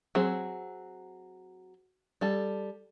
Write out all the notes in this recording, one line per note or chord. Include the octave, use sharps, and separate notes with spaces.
F#3 C4 G#4
G3 A4